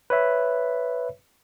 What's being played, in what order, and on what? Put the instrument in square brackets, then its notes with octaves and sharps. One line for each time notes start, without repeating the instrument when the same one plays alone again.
[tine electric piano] B4 C#5 E5